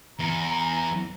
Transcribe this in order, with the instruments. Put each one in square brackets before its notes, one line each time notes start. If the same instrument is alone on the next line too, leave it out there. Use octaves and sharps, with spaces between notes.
[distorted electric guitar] E2 [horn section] A#5